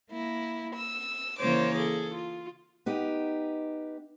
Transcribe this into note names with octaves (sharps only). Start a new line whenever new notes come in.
A#3 E4
E6
C#3 E3 A#3 C5 C#5 D6
G#4 A4
F4
B3 D#4 G4